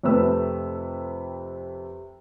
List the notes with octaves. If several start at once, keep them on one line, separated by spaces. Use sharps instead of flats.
F2 C3 A3 B4 E6